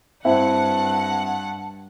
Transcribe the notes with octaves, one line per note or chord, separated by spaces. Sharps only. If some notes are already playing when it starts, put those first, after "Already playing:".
G2 C4 E4 E5 F#5 A5